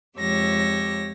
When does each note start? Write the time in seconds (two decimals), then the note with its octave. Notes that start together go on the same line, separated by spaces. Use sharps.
0.18 F2 G#3 G4 C#5 E6 A#6